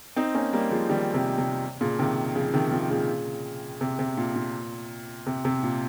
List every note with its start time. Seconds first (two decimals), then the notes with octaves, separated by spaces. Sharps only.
0.16 C4 D#4
0.35 A#3 C#4
0.53 G3 A#3
0.71 F3 G#3
0.89 D#3 G3
1.14 C3
1.38 C3
1.81 A#2 C#3
1.99 C3 D#3
2.35 C#3 F3
2.53 C3 D#3
2.71 C#3 F3
2.90 A#2 C#3
3.81 C3
3.99 C3
4.17 A#2
4.36 A#2
5.26 C3
5.45 C3
5.63 A#2